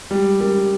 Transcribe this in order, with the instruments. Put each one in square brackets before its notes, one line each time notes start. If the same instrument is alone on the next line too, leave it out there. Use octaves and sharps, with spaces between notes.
[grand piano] G3 [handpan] G#3
[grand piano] G3 [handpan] C#4 G4 A#4